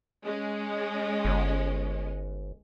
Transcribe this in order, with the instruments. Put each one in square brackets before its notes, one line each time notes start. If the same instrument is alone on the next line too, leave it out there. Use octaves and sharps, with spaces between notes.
[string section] G#3 C#4
[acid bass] G1